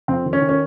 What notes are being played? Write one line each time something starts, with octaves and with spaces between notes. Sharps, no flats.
F2 C4
D#3
C#4
D#3
C#4